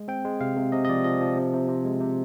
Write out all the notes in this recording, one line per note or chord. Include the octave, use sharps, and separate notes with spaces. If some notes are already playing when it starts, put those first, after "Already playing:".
Already playing: G#3
C4 G5
G#3
C3 F5
C3
C3 D#5
D#5
F3 D5
F3 D#5
F3
C3
C3
C3
G#3
C3